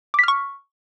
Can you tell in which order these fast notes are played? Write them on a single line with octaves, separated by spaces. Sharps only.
D6 B6 F6 C#6